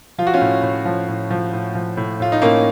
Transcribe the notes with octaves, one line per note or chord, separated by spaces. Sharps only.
F3 F4
F#4
C#4 F4
A2
A2
F3
A2
F3
A2
F3
A2
A2 F4
D#4
A2 A#3 C#4